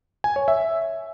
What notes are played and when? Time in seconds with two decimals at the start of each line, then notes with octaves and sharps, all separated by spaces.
0.24 G#5
0.36 C#5
0.48 E5